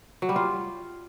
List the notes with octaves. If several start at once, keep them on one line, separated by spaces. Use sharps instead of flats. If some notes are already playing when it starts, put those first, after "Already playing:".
F#3
G3
F4